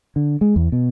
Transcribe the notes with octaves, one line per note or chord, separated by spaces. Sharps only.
D3
G#3
E2
B2